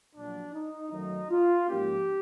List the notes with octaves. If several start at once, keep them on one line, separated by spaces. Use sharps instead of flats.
A#1 A#2 F#3 D4
D#4
F#2 D#3 F#3 A3 D#4
F4
G#2 F3 A#3 C#4 G4